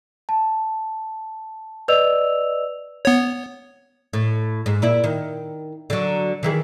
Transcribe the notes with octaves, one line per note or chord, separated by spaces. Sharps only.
A5
B4 D5 D#5 E6 F7
B3 C#5
A2
G#2
A#2 E4 D5
D#3
D3 F#3
D#3 E3 G#4